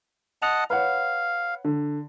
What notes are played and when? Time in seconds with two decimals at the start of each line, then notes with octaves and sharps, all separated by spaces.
0.42 D#5 F#5 A5 F7
0.70 B4 C#5 F5 F#5
1.65 D3